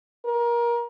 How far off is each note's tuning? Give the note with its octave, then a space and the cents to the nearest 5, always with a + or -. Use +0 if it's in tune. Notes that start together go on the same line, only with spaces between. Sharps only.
A#4 +25